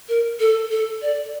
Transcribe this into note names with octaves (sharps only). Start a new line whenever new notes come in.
A#4
A4
A4
D5